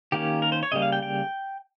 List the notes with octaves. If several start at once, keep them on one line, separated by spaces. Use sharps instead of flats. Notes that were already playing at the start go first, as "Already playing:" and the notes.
D#3 A#3 C#4 G4
A#4
C5
C#5
C#3 G3 A#3 D#5
F5
G5
G5